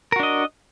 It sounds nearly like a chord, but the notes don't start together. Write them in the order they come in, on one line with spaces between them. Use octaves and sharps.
A#4 F#4 D4 D#5